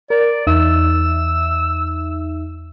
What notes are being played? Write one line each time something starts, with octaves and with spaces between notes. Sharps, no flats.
A#4 D5
E2 D#4 E5 E6